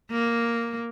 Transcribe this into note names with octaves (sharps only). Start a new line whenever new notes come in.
A#3